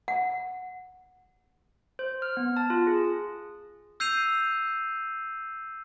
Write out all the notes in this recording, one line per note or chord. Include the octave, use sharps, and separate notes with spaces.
F#5
C5
F6
B3
A5
F4
G#4
E6 G6 C7 D#7 F7